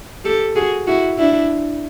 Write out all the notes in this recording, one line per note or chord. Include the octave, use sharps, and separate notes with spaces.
G4 A4
F#4 G#4
E4 F#4
D4 E4